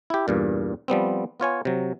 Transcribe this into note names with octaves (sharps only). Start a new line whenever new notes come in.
E4 G4
E2 G2 A#2
F3 G3 B3 C4
B3 F4 C#5 G#5
C3 F#3